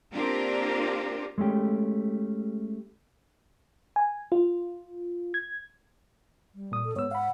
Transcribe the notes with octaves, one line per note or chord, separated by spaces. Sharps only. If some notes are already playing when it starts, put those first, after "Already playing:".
A#3 C4 D4 F4 G4 A#4
G#3 A3 C#4 G4
G#5
F4
G#6
G3
A#2 D#6
A4
G#2 B3 C#5 E6
F5 F#5 B5